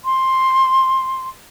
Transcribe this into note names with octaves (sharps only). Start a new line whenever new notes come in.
C6